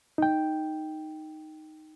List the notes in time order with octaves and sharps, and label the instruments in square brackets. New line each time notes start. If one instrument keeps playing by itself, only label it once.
[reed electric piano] D#4 G5